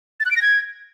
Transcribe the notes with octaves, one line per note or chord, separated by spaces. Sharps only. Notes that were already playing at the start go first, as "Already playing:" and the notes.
A6
F#6
D7
A#6
G#6